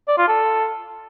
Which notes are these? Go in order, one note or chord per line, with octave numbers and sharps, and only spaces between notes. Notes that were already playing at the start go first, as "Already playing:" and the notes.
D5
F4
A4